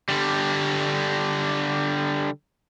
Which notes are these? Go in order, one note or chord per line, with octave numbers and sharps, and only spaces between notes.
D3 G3